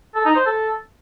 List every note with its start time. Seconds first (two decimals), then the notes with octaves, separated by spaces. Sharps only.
0.15 A4
0.25 D#4
0.36 C5
0.46 A4